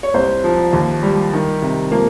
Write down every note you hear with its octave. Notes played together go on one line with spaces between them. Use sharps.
C#5
C2 C5
F3
D#2
G3
D#3
C3
F3 A#3